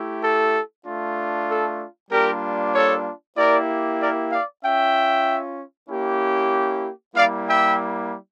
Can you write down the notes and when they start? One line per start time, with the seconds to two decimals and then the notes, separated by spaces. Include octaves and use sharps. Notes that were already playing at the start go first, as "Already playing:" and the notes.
Already playing: A3 E4 G4
0.22 A4
0.85 A3 D4 F4
1.48 A4
2.11 G3 A#3 D4 F4 G4 A#4
2.74 A4 C#5
3.37 A#3 E4 G4 A#4 D5
4.00 A#4 D5
4.32 D5 F5
4.63 C#4 F4 E5 G5
5.90 A#3 C#4 E4 G4
7.15 G3 A#3 E4 D5 F5
7.48 E5 G5